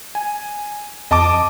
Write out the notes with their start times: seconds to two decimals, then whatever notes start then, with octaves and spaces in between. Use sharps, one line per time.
0.15 G#5
1.11 F2 D#5 A5 D6